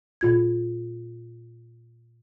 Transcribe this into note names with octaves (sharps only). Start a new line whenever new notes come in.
A#2 F4 G#6